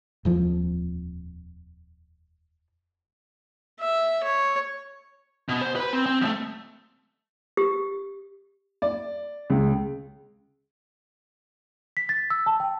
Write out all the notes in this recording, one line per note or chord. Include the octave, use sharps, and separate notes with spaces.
D#1 F2 F3
E5
C#5
B2
C5
B4 B5
C4
C4
F3 A3
G4
D5
C#2
B6
A6
E6
A5
G5